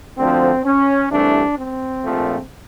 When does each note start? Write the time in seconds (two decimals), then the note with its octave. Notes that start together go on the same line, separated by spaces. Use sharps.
0.18 D2 D3 F3 C4
0.65 C#4
1.11 C2 C3 E3 A3 D4
1.58 C4
2.04 A#1 A#2 F3 A3